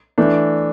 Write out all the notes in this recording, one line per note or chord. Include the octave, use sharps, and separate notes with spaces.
E3 A3 D4